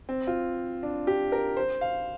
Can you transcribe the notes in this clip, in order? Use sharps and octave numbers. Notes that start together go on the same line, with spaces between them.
C4
F4
D4
G4
A#4
C5
F5